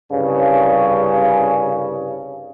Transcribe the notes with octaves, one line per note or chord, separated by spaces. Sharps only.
C2 G2 C#3